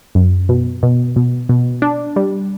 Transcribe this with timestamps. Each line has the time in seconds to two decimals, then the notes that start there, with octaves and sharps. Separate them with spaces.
0.15 F#2
0.49 B2
0.83 B2
1.16 B2
1.49 B2
1.82 D4
2.16 G3